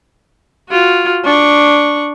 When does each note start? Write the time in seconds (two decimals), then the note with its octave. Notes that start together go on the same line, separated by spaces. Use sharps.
0.69 F4 F#4
1.24 D4 C#6